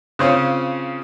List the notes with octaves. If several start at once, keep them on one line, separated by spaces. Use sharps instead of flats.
C#3 C4 C#4 F4